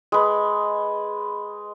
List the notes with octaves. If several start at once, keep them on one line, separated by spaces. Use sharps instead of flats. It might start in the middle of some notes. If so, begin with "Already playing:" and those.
G#3 B4